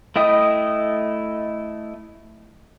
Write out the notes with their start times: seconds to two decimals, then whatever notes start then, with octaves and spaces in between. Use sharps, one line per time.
0.16 A3 E4 D#5 G5 D#6